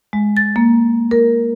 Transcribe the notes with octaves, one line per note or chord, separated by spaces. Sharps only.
G#3
A6
A#3
A#4